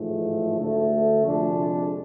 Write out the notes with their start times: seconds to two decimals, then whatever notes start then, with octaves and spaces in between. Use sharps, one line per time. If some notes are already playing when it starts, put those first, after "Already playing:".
Already playing: A1 G#2 F3 A3
0.58 D2 D3 A3
1.25 F2 C3 G#3 D4